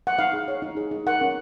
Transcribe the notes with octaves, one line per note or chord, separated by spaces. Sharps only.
F#5
D#4 F5
G#4
C#5
D#4
G#4
D#4
A#4 F#5
C#4